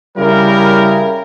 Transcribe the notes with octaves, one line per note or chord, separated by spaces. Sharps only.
C#3 G3 E4 A#4